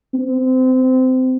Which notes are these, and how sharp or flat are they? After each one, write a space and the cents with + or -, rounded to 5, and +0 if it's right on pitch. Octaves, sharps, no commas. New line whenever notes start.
C4 -25